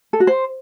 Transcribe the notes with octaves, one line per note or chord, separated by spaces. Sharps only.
A4
F#4
C5